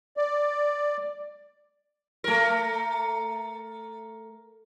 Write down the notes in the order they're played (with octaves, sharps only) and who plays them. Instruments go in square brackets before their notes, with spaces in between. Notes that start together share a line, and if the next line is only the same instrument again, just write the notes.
[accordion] D5
[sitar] A3 A#4